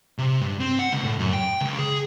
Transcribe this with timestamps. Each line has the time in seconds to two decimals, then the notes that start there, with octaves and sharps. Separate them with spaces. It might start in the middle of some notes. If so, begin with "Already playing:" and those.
0.18 C3
0.41 G2
0.60 C4
0.79 F#5
0.93 C#2
1.04 A2
1.19 F#2
1.33 G5
1.61 C#2
1.78 G#4